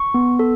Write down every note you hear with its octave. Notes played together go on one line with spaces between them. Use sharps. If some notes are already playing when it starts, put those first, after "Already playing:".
Already playing: C#6
B3
A4